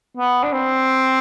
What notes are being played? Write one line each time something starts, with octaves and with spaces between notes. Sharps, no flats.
B3
D4
C4